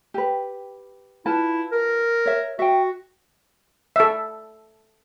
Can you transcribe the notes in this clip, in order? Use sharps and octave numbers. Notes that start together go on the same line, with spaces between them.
G4 B4
E4 F4 B4 A5
A#4
C#5 E5
F#4 E5 G5
A4 E5